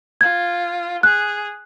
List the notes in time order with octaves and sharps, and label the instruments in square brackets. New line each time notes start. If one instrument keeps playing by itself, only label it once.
[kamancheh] F4 [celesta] G#6
[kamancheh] G#4 [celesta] F#6